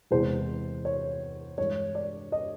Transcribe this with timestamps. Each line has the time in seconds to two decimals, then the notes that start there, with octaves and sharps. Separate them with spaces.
0.11 E2 C3 E3 G#3 C5
0.85 C#5
1.58 G2 E3 G#3 C#5
1.95 D5
2.32 D#5